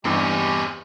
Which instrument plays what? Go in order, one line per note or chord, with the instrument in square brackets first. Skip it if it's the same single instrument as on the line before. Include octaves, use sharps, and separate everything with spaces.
[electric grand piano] E2 G2 [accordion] G#3 G4 [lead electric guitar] C4 C#4